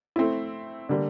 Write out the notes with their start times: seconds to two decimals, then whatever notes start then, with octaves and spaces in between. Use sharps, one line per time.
0.16 A3 C4 E4
0.89 D3 G3 A#3